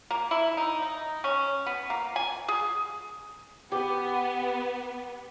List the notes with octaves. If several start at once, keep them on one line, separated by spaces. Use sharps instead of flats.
A#3
E4
D#4
D#4
C#4
B3
A#3
G#5
G#4
B3 G4